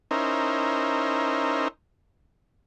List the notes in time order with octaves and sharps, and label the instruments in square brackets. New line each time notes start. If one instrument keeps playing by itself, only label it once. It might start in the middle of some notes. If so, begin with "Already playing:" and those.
[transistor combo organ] C#4 D#4 E4 A#4 C5